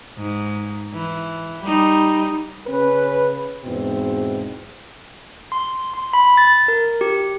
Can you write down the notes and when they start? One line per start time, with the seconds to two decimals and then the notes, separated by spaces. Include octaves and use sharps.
0.17 G#2
0.93 E3
1.64 G3 D#4
2.67 C#3 C#4 B4
3.64 E2 G#2 B2 C4
5.52 C6
5.94 C6
6.13 B5
6.37 A6
6.68 A#4
7.01 G4